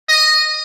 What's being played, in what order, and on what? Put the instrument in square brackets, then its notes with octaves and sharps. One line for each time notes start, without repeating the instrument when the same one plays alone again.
[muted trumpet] D#5